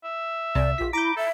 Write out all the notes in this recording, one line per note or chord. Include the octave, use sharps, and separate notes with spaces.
E5
C2 C3 D5
A#1 F4 B6
E4 A#5 B5 D6 G6
A4 E5